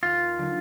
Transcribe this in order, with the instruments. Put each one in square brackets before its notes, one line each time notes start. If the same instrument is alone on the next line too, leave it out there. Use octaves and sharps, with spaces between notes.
[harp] D#2 [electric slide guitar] F4
[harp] D3 F#3 A#3 D#4